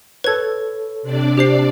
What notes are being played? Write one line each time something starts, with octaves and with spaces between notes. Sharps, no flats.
A4 B4 C#5 G#6
C3 D4 D5
G4 C5 C7